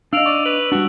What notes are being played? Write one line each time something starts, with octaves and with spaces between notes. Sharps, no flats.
D4 D#5 F5 E6 D7 F7
D5 C#6
B4 F#7
G3 D4 F#4